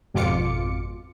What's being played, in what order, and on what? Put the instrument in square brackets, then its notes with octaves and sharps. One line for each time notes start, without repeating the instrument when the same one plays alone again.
[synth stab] G#1 F2 B2 F4 D6 C#7